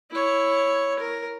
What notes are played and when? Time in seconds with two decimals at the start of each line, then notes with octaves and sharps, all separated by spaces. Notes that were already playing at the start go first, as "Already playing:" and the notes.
0.11 E4 C#5
0.99 A#4